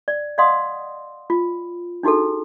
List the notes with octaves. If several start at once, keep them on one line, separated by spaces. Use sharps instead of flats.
D5
D5 D#5 F5 F#5 C6 D#6
F4
D4 D#4 F#4 G#4 A4